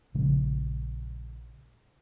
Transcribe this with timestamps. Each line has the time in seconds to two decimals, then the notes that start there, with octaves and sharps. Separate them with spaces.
0.15 A#1 C#3 F3 G#3